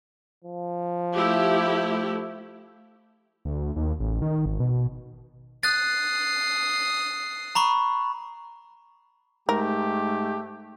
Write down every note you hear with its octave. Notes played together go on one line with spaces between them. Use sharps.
F3
A3 E4 G4
D2
D#2
A1
D#3
G#1
B2
D#6 F#6 A6 C7
A#5 B5 C#6
G#2 A3 G4 A#4